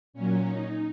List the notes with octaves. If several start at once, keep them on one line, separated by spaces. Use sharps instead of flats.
A#2 F#3 C#4
D#4